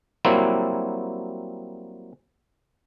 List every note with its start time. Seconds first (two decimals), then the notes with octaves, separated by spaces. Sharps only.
0.25 F#3 G3 A#3 C4 E4